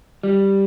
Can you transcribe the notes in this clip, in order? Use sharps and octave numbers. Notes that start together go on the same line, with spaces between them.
G3